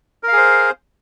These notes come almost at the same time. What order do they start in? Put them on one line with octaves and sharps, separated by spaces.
A#4 F5 G#4 C5